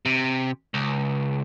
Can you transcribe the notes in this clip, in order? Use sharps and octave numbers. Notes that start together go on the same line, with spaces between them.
C3
C#2